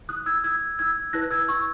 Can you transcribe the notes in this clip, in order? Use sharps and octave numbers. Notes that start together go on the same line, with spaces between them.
D#6 F#6
E6 G#6
E6 G#6
E6 G#6
E4 B4 F#6 A#6
E6 G#6
C#6 E6